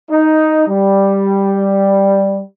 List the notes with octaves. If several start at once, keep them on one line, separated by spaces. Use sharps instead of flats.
D#4
G3